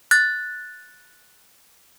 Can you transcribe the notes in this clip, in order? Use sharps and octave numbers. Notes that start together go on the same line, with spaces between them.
F#6 A6